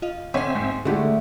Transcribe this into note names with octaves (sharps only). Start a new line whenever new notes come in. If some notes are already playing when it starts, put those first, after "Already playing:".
F4 D#5 F5
D3 C4 C#4 C#5 D#5 E5 C6
G#2
D3 G#3 A3 C#4 E4 F#4 G4